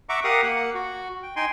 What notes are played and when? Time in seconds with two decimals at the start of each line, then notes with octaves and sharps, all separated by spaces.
0.09 E5 F#5 A#5 C#6 D6
0.24 G4 A#4 F5 F#5 D#6
0.43 A#3 F#5
0.74 F#4
1.23 G5
1.36 D#4 G5 G#5 C6